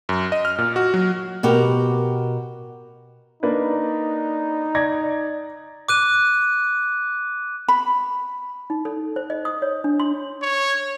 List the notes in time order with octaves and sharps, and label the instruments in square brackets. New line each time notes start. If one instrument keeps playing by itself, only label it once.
[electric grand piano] F#2
D#5
F6
A#2
F#4
F#3
[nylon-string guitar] B2 F#4 G4 A#4
[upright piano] A#3 D4 B4 [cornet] D#4
[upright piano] D5 G#6 A#6
[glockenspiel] D6 F#6 D#7
[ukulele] B5
[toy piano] D#4
A4
C5
D#5
D#6
C#5
D4
C6
[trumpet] C#5